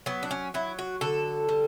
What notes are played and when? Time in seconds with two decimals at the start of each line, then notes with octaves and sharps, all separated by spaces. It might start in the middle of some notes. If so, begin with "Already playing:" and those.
0.06 F#3 B3
0.23 D4
0.31 C#4
0.54 F#3 E4
0.79 F#4
1.01 D3 A4
1.49 G3